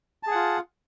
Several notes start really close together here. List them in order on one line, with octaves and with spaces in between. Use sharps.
A5 G#4 F#5 F4